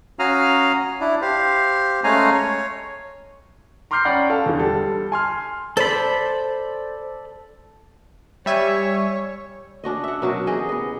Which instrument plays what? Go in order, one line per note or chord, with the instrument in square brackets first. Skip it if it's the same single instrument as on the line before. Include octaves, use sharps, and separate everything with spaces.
[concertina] C#4 F#4 F5 A#5 D#6 F6
D4 E4
G4 C5 F5
G#3 A3 C#4 F5 G#5 A#5
C#5
[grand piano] A#5 C6 D6 F6 G6 C7
C#4 D5 F#5 G5 B5
A4 F5
E2 D3
G3 A4
G#5 C6 F6
[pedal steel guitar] A4 D5 B5 [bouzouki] C5
[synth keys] G3 E5 G#5 [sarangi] C#5
[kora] C#4 D4 F#4 D#5
E5 F#5
B2 F#3 F#4 A#4
E3 G4 G#4 D#5
B3 D#5